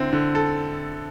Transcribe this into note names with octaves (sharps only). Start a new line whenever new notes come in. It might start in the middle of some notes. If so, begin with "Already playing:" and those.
Already playing: D3 C4 E4
D3
A4